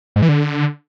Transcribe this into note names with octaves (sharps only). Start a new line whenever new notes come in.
G#2
E3
D3